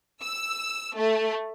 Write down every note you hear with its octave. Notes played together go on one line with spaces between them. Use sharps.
E6
A3